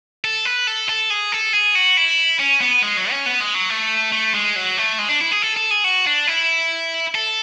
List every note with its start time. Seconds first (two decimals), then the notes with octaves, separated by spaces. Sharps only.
0.24 A4
0.45 B4
0.67 A4
0.89 A4
1.10 G#4
1.32 A4
1.53 G#4
1.75 F#4
1.97 E4
2.39 C#4
2.61 B3
2.83 G#3
2.97 F#3
3.11 C#4
3.26 B3
3.41 G#3
3.55 F#3
3.70 A3
4.12 A3
4.34 G#3
4.56 F#3
4.77 A3
4.98 G#3
5.09 D4
5.21 E4
5.31 G#4
5.42 A4
5.57 A4
5.71 G#4
5.84 F#4
6.07 D4
6.27 E4
7.15 A4